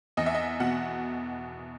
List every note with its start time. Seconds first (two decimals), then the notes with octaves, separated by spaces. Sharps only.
0.17 E2 D#5
0.26 E5
0.35 D#5
0.60 B2 F#5